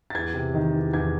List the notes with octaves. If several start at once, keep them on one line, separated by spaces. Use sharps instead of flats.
A6
E2 G#6
C3
D#3
E2
E2 G#6